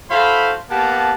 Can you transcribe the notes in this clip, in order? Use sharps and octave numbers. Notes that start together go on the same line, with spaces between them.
E4 F#4 A4 C5 F5 B5
A#3 B3 G4 F#5 A5